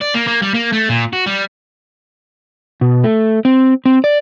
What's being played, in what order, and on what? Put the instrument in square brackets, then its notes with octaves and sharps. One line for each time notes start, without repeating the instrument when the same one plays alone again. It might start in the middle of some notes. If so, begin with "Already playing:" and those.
[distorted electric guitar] D5
A#3
A#3
G3
A#3
A3
A#2
F#4
G3
[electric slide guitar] B2
A3
C4
C4
D5